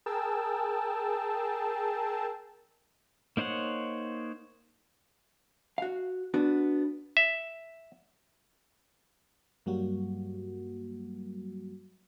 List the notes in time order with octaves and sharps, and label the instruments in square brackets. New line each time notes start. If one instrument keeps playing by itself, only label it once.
[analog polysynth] G#4 A#4 G5 A5 E6
[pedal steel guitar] A#3 D#4 C5 C#5 F#5
[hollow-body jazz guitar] F#4 F5
B3 D4 F#4
[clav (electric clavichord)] E5
[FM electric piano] G2 F#3 G3 A#3 F#4